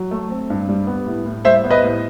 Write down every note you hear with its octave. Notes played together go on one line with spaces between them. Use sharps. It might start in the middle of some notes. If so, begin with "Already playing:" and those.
Already playing: F#3
A3
C4
G2
G3
B3
A2
A2
G3 C5 E5
B3
B4 D#5
A2